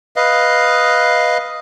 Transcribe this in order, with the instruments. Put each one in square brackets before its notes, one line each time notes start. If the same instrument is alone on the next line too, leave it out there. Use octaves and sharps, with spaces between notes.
[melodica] B4 D#5 F5